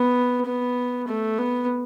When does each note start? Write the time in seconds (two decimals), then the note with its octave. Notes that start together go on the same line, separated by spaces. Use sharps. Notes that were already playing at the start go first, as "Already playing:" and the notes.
Already playing: B3
0.46 B3
1.08 A3
1.38 B3